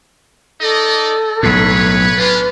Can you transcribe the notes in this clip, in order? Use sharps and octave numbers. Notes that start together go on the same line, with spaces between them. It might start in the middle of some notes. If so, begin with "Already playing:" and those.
D#4 A4 D5 D#5
B1 A2 B4 C#5
C#4 D4 F4 B4